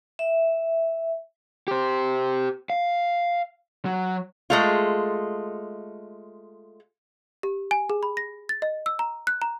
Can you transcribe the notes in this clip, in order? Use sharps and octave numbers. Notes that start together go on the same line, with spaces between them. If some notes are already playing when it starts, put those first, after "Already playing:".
E5
G4 C5
F5
F#3
G#3 A3 F4
G4
G#5
G#4
B5
A#6
A6
D#5
E6
A#5
F#6
A#5